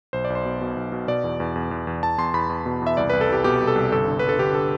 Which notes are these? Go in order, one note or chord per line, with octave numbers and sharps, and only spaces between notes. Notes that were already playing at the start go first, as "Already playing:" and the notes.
B1 C5
D5
B1
C5
B2
B2
B1
B2
B2 D5
E2
E2
E2
E2
E2
E2 A5
E2 C6
E2 B5
E2
B2
E2
E5
C2 D5
C2 B4
A4
C2 G4
B2 G4
C2
A4
C2
G1 A4
D3
G1 B4
A4
D3 G4
A4